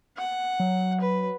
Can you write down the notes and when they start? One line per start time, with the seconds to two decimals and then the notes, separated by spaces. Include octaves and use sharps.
0.17 F#5
0.60 F#3
1.00 B4